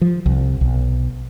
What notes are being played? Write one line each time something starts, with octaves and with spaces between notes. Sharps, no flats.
F3
C2
B1